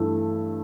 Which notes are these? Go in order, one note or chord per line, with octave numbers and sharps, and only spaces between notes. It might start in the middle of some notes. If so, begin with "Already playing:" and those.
Already playing: G2 E3 A3 E4 A4